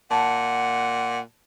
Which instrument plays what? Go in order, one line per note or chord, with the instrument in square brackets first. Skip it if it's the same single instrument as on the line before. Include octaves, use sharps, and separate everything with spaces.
[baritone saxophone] A#2 [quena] F#5 [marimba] A5